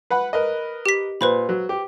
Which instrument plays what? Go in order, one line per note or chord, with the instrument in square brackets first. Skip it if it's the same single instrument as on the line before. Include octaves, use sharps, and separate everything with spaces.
[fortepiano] B4 F#5 B5
A#4 B4 D#5
[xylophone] G4 B6
[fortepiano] A#2 [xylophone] B4 C5 B5
[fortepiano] F#3
G4